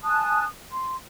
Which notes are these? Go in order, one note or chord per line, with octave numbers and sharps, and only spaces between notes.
G#5 A5 D#6 F#6
C6